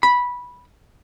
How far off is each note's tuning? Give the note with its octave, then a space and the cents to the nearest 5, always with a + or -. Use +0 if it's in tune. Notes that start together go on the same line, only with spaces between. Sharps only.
B5 -10